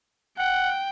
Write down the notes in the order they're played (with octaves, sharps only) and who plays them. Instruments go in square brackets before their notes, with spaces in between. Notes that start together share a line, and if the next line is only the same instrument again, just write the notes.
[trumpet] F#5 [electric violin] G5